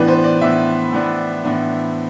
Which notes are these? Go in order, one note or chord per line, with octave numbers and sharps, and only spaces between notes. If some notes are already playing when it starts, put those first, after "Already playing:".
Already playing: A2 E3 B3 D4 B4
C5
D5
A2 E3 B3 D4 E5
A2 E3 B3 D4
A2 E3 B3 D4